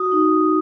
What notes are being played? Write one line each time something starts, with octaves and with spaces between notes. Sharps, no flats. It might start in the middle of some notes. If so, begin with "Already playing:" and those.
Already playing: F#4 D#6
D#4